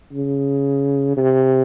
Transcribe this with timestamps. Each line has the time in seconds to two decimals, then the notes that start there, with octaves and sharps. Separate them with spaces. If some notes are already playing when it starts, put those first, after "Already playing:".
0.13 C#3
1.17 C3